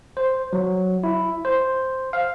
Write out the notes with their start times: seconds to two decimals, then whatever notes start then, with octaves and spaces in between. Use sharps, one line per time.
0.17 C5
0.53 F#3
1.04 E4
1.45 C5
2.13 F5